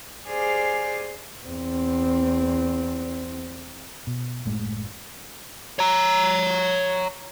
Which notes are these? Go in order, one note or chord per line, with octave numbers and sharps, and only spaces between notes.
G4 G#4 C5 D5 G#5 F6
E2 C4
B2
F#1 A2 G#3 A3
C#5 A#5